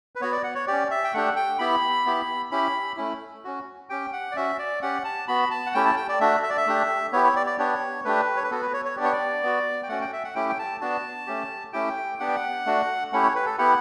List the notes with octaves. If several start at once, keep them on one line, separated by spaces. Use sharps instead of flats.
B4
B3 F#4 C#5
D5
F#5
C#5
C#4 G4 D5
E5
G5
A3 D4 G4 F#5
G5
B3 E4 G4 B5
B3 E4 G4
C#4 E4 G4 B5
A3 C#4 E4
C#4 F#4
C#4 G4 G5
F#5
D5
C#4 F#4 E5
D5
C#4 G4 F#5
A5
B3 F#4 B5
A5
F#5
A3 C#4 E4 G4 G5
A5
G5
D5
A3 D4 F#4 E5
E5
D5
E5
A3 D4 G4
B3 E4 G4 C#5
C#5
D5
D5
B3 D4 G4 C#5
A3 D4 G4 B4
C#5
B4
B3 F#4 A4
B4
C#5
C#5
B3 D4 G4 D5
C#5
D5
B3 F#4
G5
A3 C#4 F#4 F#5
G5
E5
F#5
A3 C#4 E4 G4 G5
G5
A5
B3 D4 F#4 A5
A3 C#4 G4
A3 C#4 E4 G4 G5
B3 D4 G4 F#5
G5
F#5
A3 D4 F#4
A3 C#4 E4 G4 F#5
C#5
B4
A4
B3 E4 G4 F#5